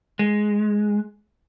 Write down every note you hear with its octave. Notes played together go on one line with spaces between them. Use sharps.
G#3